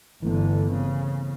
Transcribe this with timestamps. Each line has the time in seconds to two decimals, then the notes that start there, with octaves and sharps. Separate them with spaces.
0.23 G1 D3 E3 A3 B3
0.71 C#3 C4